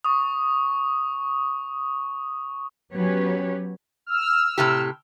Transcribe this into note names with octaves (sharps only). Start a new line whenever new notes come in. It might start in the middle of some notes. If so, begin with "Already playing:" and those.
C#6 D#6
F#3 B3 C#4 G4 B4 C#5
E6 F6
A2 C3 G4